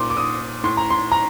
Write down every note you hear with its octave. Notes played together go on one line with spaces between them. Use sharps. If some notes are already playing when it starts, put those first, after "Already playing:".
Already playing: A#2 C6 D6
D6
D#6
A2 C6
A#5
C6
A#5